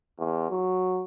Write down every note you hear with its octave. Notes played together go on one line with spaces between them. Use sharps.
E2
F#3